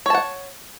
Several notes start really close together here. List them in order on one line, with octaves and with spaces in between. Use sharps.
C#5 A5 F#5